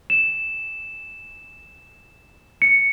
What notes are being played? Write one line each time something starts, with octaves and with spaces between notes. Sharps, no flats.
E7
C#7